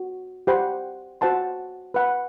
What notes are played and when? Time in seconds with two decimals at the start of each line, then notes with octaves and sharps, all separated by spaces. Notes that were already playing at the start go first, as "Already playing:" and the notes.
Already playing: F#4
0.47 G4 C5 F#5 B5
1.21 F#4 C5 F#5 A5 C6
1.94 B4 F#5 B5